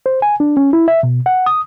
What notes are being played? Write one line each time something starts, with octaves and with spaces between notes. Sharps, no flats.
C5
G#5
D4
C#4
E4
E5
B2
F#5
D#6